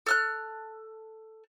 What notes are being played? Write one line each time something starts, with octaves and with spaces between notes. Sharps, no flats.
A4 F6 F#6